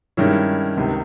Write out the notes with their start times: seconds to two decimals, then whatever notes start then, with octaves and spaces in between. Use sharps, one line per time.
0.17 G2 D#3 G#3 C#4 E4
0.77 C#2 C3 D#3